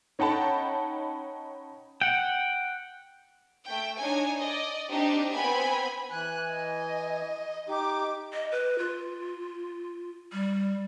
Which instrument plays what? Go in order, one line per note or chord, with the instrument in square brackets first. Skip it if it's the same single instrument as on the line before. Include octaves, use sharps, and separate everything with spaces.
[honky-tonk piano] C#4 D#4 F#5 G5 A5 B5
[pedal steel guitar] F#5 G5
[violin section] A3 G5
D4 D#4 C#5 G#5
D5 D#5
C4 D4 D#4 G4
B3 C4 G5 G#5 B5
[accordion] E3 G#5 [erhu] F#6
[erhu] D#5
[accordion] D#4 G4 [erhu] D6
[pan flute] D#5
B4
F4
G3